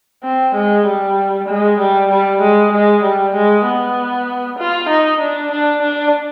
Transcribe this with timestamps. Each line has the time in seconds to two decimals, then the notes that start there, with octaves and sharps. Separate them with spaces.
0.24 C4
0.55 G#3
0.86 G3
1.48 G#3
1.79 G3
2.10 G3
2.41 G#3
2.72 G#3
3.03 G3
3.35 G#3
3.65 B3
4.59 F4
4.89 D#4
5.20 D4
5.52 D4
5.82 D4